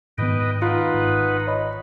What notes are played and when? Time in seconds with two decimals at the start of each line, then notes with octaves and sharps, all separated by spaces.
0.18 G#2 D#3 B3 B4 D#5 G5
0.62 D#4 F4 B4 F#5
0.94 G#1
1.47 C#5 D#5 B5